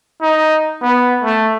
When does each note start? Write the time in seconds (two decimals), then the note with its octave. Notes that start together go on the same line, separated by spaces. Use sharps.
0.21 D#4
0.82 B3
1.24 A3